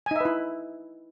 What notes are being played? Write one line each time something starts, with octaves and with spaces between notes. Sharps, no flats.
D#4 E4 B4 E5 G#5